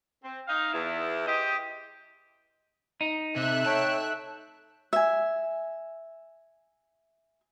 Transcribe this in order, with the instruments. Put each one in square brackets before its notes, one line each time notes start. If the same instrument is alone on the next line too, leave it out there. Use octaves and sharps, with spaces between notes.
[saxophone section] C4
D#4 F5
E2 E4
G4 C5 D#5
[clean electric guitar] D#4
[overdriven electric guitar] C3 [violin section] A3 E5 F#6
[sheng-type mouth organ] C#5 G5 [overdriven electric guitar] A5
[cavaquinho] E5 G#5